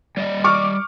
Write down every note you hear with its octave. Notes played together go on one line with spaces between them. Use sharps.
G3 D5 D#5
C#6 D6 F6